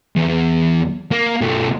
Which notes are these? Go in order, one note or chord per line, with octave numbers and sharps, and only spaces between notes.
E2
A#3
B1 A3